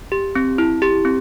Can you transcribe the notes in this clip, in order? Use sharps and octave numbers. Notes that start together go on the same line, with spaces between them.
G4
C4
E4
G4
C4